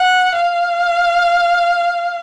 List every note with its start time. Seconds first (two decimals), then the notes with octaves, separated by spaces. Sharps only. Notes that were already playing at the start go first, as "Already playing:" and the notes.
Already playing: F#5
0.35 F5